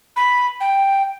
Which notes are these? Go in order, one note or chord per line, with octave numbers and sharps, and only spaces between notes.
B5
G5